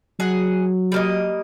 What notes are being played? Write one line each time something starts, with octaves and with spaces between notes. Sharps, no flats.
F#3 G#4 F#5
G3 A#3 D#5